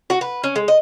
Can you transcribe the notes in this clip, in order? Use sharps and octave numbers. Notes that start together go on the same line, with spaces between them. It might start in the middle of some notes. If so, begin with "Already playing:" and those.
F#4
B4
C#4
G#3
D#5